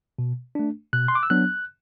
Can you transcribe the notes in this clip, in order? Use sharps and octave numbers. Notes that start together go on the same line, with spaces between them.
B2
A3 D4
B2 F#6
C6
D6
E6
F#3 B3 D4 F#6